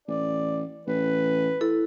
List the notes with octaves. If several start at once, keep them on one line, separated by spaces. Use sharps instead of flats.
A1 D5
A1 B4
E4 A4